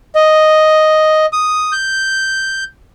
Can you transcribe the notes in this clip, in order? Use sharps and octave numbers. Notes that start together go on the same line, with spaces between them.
D#5
D#6
G6